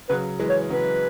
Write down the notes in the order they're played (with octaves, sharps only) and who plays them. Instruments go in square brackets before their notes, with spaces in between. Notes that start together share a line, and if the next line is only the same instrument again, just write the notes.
[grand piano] C#3 F#3 [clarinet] B4
[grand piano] E3 G#3
[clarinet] C#5
[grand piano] C#3 F#3 [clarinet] B4